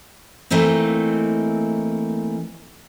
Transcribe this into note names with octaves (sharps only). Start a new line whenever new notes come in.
E3 A3 A#3 C4 D#4